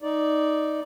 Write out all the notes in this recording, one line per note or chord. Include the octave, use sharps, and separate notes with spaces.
D#4 D5